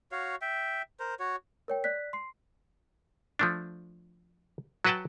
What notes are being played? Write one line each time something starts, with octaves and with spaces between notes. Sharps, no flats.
F#4 C#5 F5
E5 G5
A#4 C5
F#4 C#5
A#4 C#5 G5
D5 F#6 B6
C6 C7
F3 A3 D4
F#3 F#4 B4 F#5 G5 A5